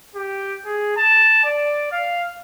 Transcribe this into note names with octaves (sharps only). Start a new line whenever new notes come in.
G4
G#4
A5
D5
F5